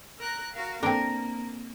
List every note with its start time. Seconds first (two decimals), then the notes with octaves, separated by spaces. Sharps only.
0.19 A#4 A#5 F#6
0.53 F#4 A#4 F5
0.83 A#3 C4 D4 A#4